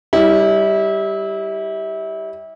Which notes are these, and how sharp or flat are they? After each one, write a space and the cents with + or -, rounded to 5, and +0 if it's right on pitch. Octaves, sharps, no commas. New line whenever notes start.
G3 +0 E4 -30